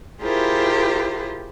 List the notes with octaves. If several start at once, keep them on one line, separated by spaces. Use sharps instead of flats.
E4 F4 G4 G#4 A#4 C5